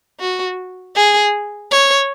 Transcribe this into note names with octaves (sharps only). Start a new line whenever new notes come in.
F#4
G#4
C#5